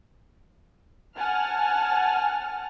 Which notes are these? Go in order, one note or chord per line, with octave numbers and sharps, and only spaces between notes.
F#5 G#5 A5 F6